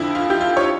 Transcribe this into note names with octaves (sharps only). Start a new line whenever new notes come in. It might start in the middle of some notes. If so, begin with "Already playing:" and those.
Already playing: F2 D3 F3 E4
F4
G4
F4
C#5